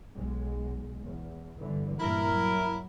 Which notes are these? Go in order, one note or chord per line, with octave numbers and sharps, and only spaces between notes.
B1 B2 G#3
E2
G1 D3 E3
G2 A#2 E3 E4 A#4
F#3